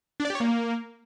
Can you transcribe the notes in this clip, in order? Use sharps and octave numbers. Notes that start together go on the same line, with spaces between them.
D4
D5
G4
C#5
A#3